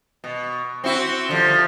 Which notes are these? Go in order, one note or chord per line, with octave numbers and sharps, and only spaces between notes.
B2
C4 E4 F#4
D3 F3 G3